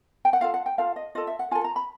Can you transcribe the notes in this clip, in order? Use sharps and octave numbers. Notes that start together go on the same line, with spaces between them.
G5
F#5
F4 A4 F5
F#5
G5
F4 A4 F5
D#5
F4 A4 D#5
E5
F#5
F4 A4 G#5
A#5
B5